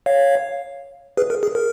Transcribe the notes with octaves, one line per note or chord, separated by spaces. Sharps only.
C#5 F5
G#4 B4
A#4
G#4
A#4